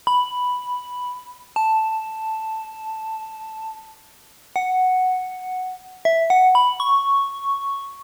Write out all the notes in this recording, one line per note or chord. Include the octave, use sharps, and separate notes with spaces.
B5
A5
F#5
E5
F#5
B5
C#6